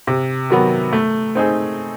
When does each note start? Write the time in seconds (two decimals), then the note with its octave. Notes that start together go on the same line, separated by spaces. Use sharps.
0.07 C3
0.50 D#3 F#3 B3
0.93 A3
1.35 C4 D#4 G#4